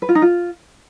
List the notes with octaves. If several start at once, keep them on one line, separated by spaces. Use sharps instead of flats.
B4
F4
D#4
F4